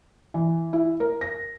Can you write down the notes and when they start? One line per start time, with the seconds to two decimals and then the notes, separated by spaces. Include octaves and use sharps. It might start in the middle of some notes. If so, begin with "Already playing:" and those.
0.34 E3
0.73 E4
1.00 A#4
1.21 A#6